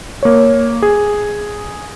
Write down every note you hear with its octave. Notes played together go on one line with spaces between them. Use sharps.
A#3 C#5
G#4